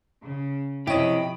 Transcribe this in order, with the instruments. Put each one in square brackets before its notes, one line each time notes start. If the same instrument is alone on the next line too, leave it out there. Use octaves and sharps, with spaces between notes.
[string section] C#3
[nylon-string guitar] C3 [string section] F3 B5 [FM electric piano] E4 C#5 [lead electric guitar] G4 D#5